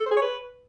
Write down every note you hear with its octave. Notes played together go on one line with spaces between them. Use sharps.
A4
C5
G#4
C#5
B4